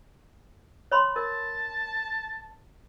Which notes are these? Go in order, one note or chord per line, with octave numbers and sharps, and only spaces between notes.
C#5 B5 C6
A#4 A5